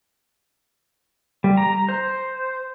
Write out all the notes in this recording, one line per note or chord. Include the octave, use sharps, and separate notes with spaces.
G3
A#5
C5